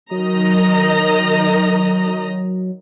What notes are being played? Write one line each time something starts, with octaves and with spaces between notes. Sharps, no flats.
D#3 F#3 D#5 A#5